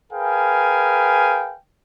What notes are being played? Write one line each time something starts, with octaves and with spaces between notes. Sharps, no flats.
G#4 A#4 B4 F5 G5 G#5